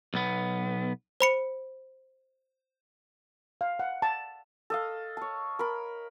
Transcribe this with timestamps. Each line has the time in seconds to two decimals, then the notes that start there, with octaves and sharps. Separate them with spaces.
0.14 B1 B3
1.20 C5 B5 C#7
3.61 F5
3.79 F#5
4.02 A5
4.70 A4 D#5 F5
5.17 C#5 A5
5.59 A#4 B5